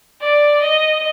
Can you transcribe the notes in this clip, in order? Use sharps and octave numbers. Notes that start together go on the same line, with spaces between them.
D5
D#5